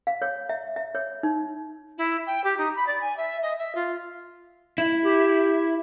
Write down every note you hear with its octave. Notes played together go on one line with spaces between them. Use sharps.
F5
C#5
E5
E5
C#5
D#4
E4
G5
G4
D#4
B5
D5
G#5
E5
D#5
E5
F4
E4
G4